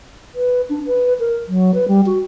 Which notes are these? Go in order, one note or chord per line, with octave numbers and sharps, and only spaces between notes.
B4
D4
B4
A#4
F#3
B4
G3
F#4